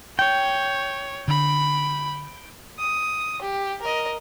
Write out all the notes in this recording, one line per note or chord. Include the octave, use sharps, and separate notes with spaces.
C#5 G5
D3 B5
D#6
G4
A#4 D#5